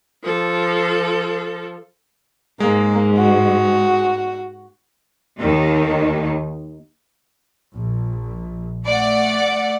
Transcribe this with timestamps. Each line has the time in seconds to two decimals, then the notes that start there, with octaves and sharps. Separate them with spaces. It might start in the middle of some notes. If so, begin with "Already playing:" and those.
0.23 F3 A4
2.60 G#2 G#3 A#3
3.18 F#4
5.39 D#2 D#3
7.74 A#1
8.85 A3 D5 F#5